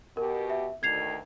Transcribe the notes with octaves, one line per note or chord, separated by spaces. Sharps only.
B2 G4 A#4
E5
D2 D#3 G#6 C7 F7